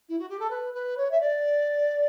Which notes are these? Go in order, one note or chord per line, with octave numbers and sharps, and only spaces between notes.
E4
F#4
G4
A4
B4
B4
C#5
E5
D5